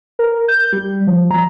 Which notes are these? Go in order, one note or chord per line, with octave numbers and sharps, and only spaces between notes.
A#4
G6
G3
F3
A#5